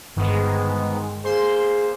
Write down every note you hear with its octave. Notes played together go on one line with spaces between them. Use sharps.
G1 G#2 D#3 G#3 B3
A#3 G#4 C5 C6